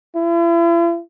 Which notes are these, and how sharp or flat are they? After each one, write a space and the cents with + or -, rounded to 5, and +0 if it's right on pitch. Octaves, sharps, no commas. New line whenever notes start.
E4 +45